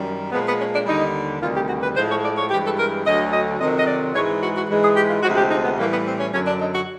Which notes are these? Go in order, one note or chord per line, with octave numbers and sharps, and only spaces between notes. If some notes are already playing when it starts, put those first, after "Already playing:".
Already playing: F#2 D#3 G3
A#2 F3 G#3 B3
B3
C#4
D4
D#2 D3 G3 D#4
D2 C3 D#3 G3 F4
G4
F#4
B4
A2 F3 G#3 C5
C#5
D5
C#5
G2 E3 G#3 G4
A4
A#4
D2 D3 F#3 D#5
D#5
F2 C3 D#3 F#3 D#5
D#5
D5
G#2 E3 G#3 C#5
F#4
F#4
G#2 E3 G#3
G#4
G4
F4
D2 C3 F3 G#3 F#4
G4
D#4
B3
A2 E3 G3 A#3
B3
C4
C#4
F#2 D3 F#3 C#4
D4
D#4
F#4